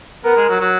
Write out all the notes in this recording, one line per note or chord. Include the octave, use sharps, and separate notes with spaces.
B3 A#4
G#3
F#3
F#3